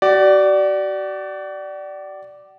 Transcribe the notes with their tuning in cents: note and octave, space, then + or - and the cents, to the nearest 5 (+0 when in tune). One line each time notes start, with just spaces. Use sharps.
F#4 +40 D5 +0